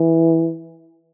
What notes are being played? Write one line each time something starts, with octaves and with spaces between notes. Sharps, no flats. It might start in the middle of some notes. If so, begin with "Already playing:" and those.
Already playing: E3